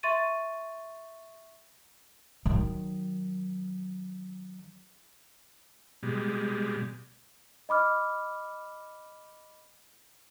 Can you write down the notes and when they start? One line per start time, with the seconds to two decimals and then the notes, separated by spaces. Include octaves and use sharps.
0.03 E5 C6 C#6 A6 D#7
2.46 D#3 F#3
6.03 B2 G3 G#3
7.69 D#5 B5 D6 F6